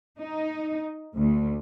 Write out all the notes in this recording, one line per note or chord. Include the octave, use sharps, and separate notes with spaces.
D#4
D2